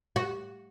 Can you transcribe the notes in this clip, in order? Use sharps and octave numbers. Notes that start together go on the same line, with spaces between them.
F#4